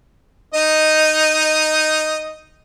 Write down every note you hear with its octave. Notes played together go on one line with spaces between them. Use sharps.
D#4 D#5